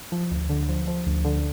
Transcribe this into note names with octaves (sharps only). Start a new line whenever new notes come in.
F3
D2
D3
F3
F3
D2
D3